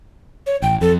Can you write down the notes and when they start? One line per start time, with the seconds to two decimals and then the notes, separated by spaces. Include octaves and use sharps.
0.47 C#5
0.62 A1 G5
0.81 F2 A4